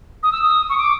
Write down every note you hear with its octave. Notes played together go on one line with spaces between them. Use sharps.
D#6
E6
D#6
C#6
D6